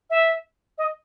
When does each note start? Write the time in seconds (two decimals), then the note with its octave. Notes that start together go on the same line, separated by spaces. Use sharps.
0.10 E5
0.78 D#5